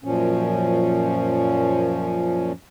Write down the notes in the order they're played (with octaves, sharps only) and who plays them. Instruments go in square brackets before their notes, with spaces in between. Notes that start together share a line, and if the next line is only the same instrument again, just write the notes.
[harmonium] F#2 A#2 F3 C#4